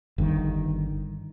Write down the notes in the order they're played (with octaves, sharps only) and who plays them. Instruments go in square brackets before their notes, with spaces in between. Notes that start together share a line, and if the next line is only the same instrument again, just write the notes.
[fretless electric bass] G1 G2 C3 D#3